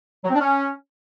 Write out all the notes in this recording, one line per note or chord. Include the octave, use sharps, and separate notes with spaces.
F#3
C4
D4
C#4